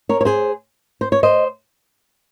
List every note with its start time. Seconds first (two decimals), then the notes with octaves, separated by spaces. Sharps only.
0.09 A#4 C#5
0.21 C#5
0.25 G#4 C5
1.01 C5
1.12 C#5
1.23 C5 D#5